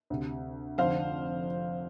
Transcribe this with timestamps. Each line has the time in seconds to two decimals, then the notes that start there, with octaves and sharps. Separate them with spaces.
0.10 D2 C3
0.78 F1 F2 D3 C5 F5